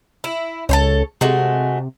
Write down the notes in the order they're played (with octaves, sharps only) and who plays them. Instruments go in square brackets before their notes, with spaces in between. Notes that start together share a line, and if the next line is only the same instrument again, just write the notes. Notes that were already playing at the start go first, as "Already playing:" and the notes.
[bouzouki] E4
[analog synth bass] C#2 [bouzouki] A4 C5 C#5
[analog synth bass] C3 [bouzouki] G#3 A3 F#4